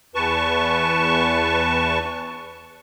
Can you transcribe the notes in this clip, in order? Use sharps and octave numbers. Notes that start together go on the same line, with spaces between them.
E2 B4 A5 C#6